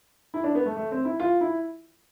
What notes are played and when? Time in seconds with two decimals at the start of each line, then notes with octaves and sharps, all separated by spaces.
0.34 E4
0.44 D4
0.55 B3
0.65 A3
0.76 A3
0.91 C4
1.05 E4
1.20 F4
1.41 E4